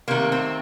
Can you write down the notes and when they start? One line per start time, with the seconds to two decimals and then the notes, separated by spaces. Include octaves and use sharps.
0.08 C3 D#3 A3 A#3
0.32 C4